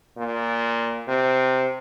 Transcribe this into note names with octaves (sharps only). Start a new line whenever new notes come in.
A#2
C3